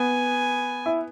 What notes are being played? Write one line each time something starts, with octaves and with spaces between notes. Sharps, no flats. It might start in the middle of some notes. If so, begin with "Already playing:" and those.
Already playing: B3 G#5
E4